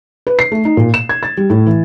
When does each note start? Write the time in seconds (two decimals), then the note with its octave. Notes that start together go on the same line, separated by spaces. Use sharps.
0.27 B4
0.39 C7
0.52 A3
0.65 D#4
0.77 A#2
0.94 E7
1.09 G#6
1.23 A6
1.37 G3
1.50 A2
1.66 E3